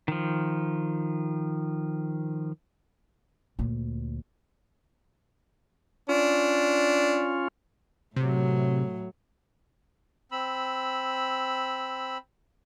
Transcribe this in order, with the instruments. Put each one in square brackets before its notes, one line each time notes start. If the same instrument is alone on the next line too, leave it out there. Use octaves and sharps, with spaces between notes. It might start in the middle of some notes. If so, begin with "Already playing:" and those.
[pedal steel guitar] D#3 F3
[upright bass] D2 A#2
[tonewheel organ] C#4 F4 [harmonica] D4
[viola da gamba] A2 F#3 [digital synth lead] C3
[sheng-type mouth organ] C4 B5 E6